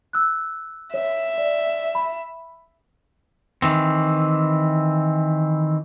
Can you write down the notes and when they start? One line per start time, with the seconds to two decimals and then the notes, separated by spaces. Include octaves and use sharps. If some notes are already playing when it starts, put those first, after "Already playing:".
0.13 E6 F#6
0.94 C#5 E5
1.38 D5
1.95 B5
3.62 D#3 E3 C4